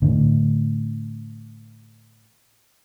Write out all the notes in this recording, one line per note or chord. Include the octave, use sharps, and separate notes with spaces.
A2 D3